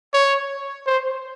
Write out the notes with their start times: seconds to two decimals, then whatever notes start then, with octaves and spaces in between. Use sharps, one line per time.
0.14 C#5
0.87 C5